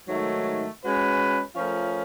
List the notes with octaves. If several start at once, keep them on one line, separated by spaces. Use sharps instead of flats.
G#2 D#3 F#3 A3
G#3 C#4 F#4 B4
F3 A3 C#4 F4 A#4